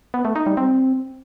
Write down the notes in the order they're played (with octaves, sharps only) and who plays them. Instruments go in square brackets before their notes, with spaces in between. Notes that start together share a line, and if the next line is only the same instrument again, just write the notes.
[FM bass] B3
A3
D#4
G3
C4